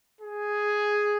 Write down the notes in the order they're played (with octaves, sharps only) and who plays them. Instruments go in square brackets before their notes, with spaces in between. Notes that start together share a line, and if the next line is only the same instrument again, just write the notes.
[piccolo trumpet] G#4